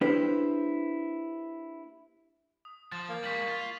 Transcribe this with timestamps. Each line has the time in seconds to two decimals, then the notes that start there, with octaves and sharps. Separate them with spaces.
0.01 A#3 D4 E4 G4 B4 C5
2.65 D#6
2.92 F3 F6 A6
3.09 A#3
3.24 G3 G#3 C#6 B6 F#7
3.48 F4